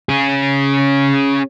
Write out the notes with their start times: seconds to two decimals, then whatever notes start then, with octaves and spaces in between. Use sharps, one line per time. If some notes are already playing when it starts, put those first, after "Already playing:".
0.09 C#4 G#4